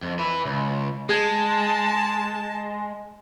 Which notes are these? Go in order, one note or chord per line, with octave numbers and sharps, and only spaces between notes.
F2
B4 E5
C#2
G#3 G#4 A5 G#6